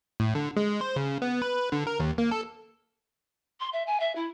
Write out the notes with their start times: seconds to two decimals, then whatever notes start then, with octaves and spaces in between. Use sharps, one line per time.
0.20 A2
0.35 D3
0.57 G#3
0.81 C5
0.96 C#3
1.22 B3
1.42 B4
1.72 D3
1.87 A#4
2.00 D#2
2.18 A#3
2.31 A4
3.60 C6
3.73 E5
3.87 G#5
4.00 E5
4.15 E4